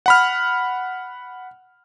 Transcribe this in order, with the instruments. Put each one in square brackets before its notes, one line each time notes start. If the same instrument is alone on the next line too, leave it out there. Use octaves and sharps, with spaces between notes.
[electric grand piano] F#5 B5 F6